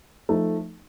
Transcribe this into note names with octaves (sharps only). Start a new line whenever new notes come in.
F3 A3 D#4